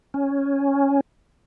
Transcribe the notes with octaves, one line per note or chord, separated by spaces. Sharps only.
C#4